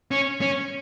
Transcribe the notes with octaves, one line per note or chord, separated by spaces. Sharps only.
C#4
C#4